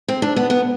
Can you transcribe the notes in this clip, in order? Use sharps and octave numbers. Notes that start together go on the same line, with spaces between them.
C4
D4
B3
B3